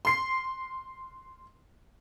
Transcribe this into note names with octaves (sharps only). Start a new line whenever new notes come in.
C6 C7